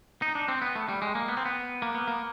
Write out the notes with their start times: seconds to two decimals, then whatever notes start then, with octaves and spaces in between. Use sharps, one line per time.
0.22 D#4
0.35 D4
0.48 C4
0.62 B3
0.75 A3
0.89 G3
1.02 G#3
1.15 A#3
1.28 B3
1.37 C4
1.45 B3
1.82 A#3
1.95 B3
2.08 A#3